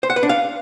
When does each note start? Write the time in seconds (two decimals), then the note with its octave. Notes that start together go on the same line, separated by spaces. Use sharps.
0.03 C5
0.10 F#5
0.16 B4
0.23 D4
0.29 F5